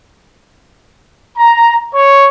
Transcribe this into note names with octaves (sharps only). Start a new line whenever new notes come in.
A#5
C#5